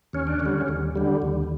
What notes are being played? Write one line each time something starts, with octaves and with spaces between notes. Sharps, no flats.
D#2 C#4
D4
D3 C#4
G3
D#2
D3 G3
D#2